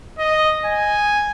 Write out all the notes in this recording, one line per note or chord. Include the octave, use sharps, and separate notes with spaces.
D#5
G#5